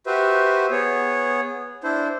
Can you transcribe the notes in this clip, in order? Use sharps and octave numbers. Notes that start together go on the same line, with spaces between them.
F#4 G4 B4 C5 E5
B3 G#4 C#5
D4 E4 C5